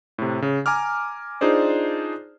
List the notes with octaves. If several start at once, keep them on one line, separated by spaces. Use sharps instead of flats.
A2 C3
C#3
G#5 A#5 D6 F6
D4 D#4 F4 G#4 C5 D5